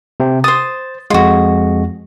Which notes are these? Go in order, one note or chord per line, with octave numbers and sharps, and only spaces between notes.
C3 C4
C5 D#6 A6
F2 G#3 F4 F#4